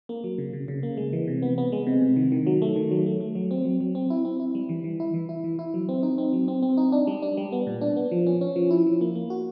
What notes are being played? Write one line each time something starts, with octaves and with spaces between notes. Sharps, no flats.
A#3
F#3
C#3
C#3
C#3
A#3
G#3
E3
C3
B3
B3
G#3
C3
C3
D#3
D#3
F#3
A3
D#3
F#3
A3
A3
F#3
C4
F#3
F#3
C4
E4
C4
E4
G3
E3
E3
E4
E3
E4
E3
E4
F#3
C4
D#4
C4
F#3
C4
C4
D#4
D4
G3
D4
G3
B3
A#2
D4
B3
F3
C#4
C#4
F3
E4
F3
A#3
A#3
F#4